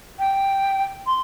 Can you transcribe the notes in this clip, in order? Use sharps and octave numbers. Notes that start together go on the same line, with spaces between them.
G5
C6